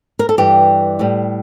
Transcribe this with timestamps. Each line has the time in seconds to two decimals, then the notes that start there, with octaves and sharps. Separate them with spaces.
0.19 A#4
0.29 A4
0.37 G2 E3 G3 G4
0.99 A2 G3